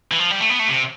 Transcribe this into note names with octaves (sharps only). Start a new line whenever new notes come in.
E3
F3
G3
A3
B3
A3
C3